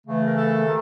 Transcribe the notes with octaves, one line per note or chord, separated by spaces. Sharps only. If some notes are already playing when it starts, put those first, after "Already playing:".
C#3 E3 A3
A#4
A4
C3 D#3